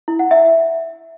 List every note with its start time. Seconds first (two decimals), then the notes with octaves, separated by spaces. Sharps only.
0.08 E4
0.19 F#5
0.31 E5